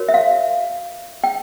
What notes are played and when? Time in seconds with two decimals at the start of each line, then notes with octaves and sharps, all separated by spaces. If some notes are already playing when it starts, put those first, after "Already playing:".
Already playing: F#4 A#4 C#5
0.08 E5
0.14 F5
1.24 G5